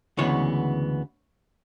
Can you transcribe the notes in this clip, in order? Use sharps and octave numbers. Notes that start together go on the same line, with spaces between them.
D2 C#3 E3 G#3 B3 C#5